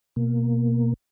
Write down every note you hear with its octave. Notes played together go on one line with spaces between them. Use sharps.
B2 A#3